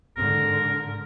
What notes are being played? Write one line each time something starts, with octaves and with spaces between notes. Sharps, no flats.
G#2 D3 A#4